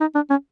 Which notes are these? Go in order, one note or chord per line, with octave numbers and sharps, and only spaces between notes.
D#4
D4
C#4